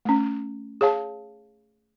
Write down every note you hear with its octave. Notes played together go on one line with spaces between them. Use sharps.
A3 C#4
G#4 C#5 F5 A5